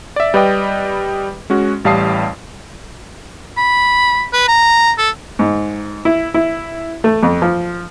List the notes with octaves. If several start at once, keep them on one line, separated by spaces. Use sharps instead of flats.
D5 E5
G3 B4 D5 D#5 G5
G#3 C#4 F#4
A1 G3 F5 A5 D#6 C7
B5
B4
A#5
A4
G#2
E4
E4
A3
F2
F3